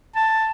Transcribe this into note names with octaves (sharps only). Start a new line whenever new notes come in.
A5